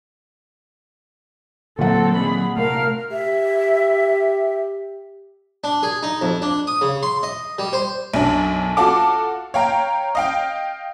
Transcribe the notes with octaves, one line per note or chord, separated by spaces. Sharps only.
A#2 D3 F#3 C4 A4 F#5
D#3 F#3 C4 G#4 B5
C3 A3 A#4 F5 F6
G4 E5
D4
G#4
D#4
F2
D4
D#6
C#3
C6
D#5
G3
C5
B1 F#2 D4
F4 F#4 A4 A5 D6
C#5 F5 G5 A#5
D#5 F5 G5